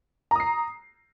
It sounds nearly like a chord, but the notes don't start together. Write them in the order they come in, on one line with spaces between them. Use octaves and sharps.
A#5 D#6 C7